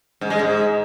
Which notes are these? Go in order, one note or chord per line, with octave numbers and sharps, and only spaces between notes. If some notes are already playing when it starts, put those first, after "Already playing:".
G#2
G#3
G#2